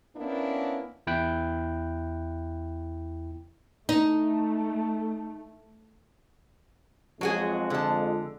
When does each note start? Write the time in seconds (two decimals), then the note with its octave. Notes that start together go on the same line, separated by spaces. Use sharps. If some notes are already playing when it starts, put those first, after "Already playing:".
0.17 A#3 B3 C#4 D4 E4 A#4
1.07 E2 E4 G5 F#6
3.89 A3 D#4
7.21 F2 F#3 G#3 F#4 G#4
7.70 D3 A5